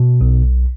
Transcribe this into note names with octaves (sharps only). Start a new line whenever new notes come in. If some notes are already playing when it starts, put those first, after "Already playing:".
Already playing: B2
B1